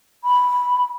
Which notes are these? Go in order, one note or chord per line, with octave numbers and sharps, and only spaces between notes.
B5